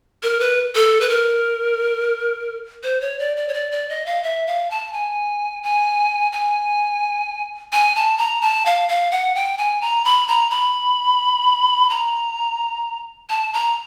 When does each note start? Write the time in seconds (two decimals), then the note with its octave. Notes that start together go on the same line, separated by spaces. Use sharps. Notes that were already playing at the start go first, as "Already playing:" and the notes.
0.23 A#4
0.40 B4
0.75 A4
1.01 B4
1.09 A#4
2.83 C5
3.01 C#5
3.19 D5
3.36 D5
3.48 C#5
3.54 D5
3.72 D5
3.89 D#5
4.06 F5
4.23 E5
4.47 F5
4.70 A5
4.93 G#5
5.63 G#5
6.32 G#5
7.73 G#5
7.95 A5
8.18 A#5
8.42 A5
8.66 F5
8.89 F5
9.11 F#5
9.35 G5
9.58 G#5
9.81 A#5
10.05 B5
10.28 A#5
10.50 B5
11.90 A#5
13.29 A5
13.53 A#5